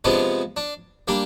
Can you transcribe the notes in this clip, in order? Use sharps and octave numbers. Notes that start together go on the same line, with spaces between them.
C3 F3 G#3 B3 D4
D4
G3 A#3 D4